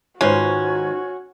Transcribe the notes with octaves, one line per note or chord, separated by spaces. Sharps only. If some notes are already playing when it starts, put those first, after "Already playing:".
G#2 D#3 C#4 F4 F#4 B4 C5